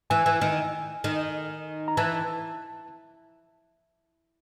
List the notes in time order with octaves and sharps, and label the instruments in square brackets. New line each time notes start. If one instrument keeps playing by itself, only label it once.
[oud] E3 [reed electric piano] G#5
[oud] E3
D#3
D#3
[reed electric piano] A#5
[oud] E3 [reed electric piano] A5